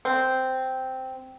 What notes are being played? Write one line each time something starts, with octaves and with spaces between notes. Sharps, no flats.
C4